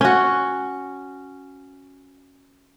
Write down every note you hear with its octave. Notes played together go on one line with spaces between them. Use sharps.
C#4 F#4